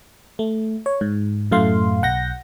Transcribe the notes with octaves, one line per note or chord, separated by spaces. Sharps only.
A3
C#5
G#2
F#2 A2 A3 F5 C6
B1 F#5 G6 A#6